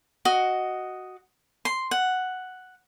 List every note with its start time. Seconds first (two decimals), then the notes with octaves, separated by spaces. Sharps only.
0.25 F#4 D#5
1.65 C6
1.91 F#5